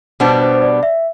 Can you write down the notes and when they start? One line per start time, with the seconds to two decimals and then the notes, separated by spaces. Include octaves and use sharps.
0.20 B2 G3 B3 D4 C5
0.41 C5
0.54 C5
0.62 D5
0.83 E5